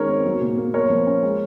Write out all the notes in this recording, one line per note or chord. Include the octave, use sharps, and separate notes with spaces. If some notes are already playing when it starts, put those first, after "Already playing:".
Already playing: D#3 G#3 C#4 A#4 C#5
C4
F#3
A#2
A#3
A#3 A#4 C#5
F3
C#4
G#3